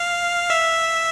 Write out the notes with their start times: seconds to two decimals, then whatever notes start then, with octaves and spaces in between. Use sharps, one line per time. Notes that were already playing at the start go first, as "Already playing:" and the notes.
Already playing: F5
0.50 E5